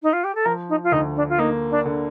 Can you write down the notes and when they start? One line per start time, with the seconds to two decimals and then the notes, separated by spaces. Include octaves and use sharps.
0.02 D#4
0.13 F4
0.24 G4
0.35 A4
0.45 F3 A#4
0.69 D#4
0.83 F4
0.92 D2 D#4
1.16 D4
1.29 F4
1.39 A#3 D#4
1.70 D4
1.86 D3